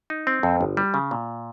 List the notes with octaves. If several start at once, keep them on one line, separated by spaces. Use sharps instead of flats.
D#4
C4
F2
G1
G3
C#3
A#2